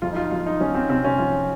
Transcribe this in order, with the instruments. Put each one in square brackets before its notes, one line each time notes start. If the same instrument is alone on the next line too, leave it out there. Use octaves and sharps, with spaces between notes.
[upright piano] F2 F4
D#4
F4
F2 F4
D#4
F3 C#4
C4
C3 C4
C#4
F3 F4